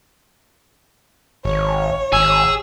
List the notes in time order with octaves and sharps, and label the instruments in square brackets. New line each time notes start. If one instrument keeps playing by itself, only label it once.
[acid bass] G#1 [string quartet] C#5
[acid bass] G#1 [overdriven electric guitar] G#4 [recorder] E6